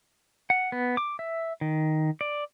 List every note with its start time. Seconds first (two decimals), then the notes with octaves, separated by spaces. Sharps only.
0.50 F#5
0.72 B3
0.97 D6
1.19 E5
1.61 D#3
2.21 D5